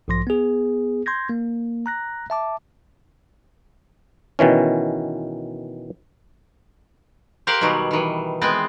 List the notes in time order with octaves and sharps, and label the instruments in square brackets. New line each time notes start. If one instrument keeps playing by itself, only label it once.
[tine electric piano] B1 G#2 F3 C6 A#6
B3 G#4
C6 G6 G#6 A#6
A#3
A#5 F#6 A#6
E5 A5 D6
[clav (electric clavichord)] B2 D#3 E3 C#4
[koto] G4 A#4 C5 F5 F#5
B2 D#3 F#3 G3
D#3 E3
G#3 B3 C4